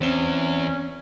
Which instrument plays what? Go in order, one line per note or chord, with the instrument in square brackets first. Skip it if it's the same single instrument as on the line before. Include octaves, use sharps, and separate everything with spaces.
[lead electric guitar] E2 [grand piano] C4 E7 G7 [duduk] C#4